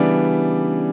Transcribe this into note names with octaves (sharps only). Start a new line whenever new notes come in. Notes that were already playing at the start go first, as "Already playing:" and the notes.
Already playing: C#3 E3 G3 B3 D4 D5